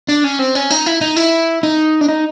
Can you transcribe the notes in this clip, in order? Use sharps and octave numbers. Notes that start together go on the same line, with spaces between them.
D4
C#4
C4
C#4
D#4
E4
D#4
E4
D#4
D4
D#4